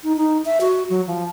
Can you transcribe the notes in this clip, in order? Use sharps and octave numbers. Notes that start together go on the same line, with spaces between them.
D#4
D#4
E5
F#4
F#3
F3